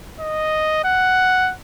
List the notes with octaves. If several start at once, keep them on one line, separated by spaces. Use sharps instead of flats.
D#5
F#5